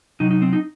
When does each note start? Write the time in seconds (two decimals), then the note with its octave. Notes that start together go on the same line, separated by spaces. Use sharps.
0.20 C3 F#3 D#4
0.31 D#4
0.42 C4
0.53 D#4